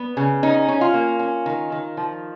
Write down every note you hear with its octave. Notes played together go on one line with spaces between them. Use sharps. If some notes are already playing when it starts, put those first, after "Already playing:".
Already playing: B3
C#3
C#4 D#4
C#4
F4
A#3
C#4
D#3
D#3
F3